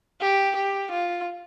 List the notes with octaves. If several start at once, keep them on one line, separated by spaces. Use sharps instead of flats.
G4
G4
F4